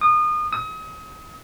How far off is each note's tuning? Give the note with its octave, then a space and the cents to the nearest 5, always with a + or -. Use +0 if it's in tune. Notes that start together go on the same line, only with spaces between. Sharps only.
D#6 -30
D#6 +35